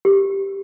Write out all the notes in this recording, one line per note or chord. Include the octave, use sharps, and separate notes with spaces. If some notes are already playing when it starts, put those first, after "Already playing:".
G4